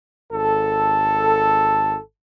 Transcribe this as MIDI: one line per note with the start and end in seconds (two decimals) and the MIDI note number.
0.32 1.98 32
0.32 1.98 69